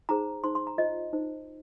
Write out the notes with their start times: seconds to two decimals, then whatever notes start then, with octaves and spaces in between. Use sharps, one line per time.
0.09 D#4 G#4 C5 A#5
0.44 D#4 C5 C6
0.55 C6
0.67 A#5
0.78 F4 C5 D#5
1.13 D#4 C5